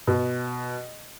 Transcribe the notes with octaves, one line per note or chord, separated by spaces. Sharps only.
B2